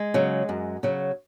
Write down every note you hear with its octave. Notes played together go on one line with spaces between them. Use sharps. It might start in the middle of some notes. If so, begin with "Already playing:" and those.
Already playing: G#3
C#3 F#3
F#2
C#3 F#3